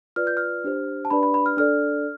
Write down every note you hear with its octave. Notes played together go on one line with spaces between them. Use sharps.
F4 B4 D5 F6
G6
F6
D4 G4 C5
A5
D4 G4 B4 D5 B5
B5
B5
F6
D4 A4 D5 F6